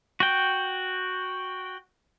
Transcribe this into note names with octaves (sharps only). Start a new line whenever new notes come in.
F#4 G5